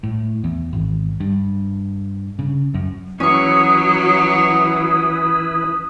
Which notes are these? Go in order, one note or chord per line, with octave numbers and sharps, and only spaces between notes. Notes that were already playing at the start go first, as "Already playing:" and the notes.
A2
E2
G#1
G2
C#3
F#2
E3 F#3 C#4 E4 B4 C#6 D#6